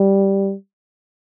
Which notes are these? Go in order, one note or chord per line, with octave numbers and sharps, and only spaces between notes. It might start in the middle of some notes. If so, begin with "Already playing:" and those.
Already playing: G3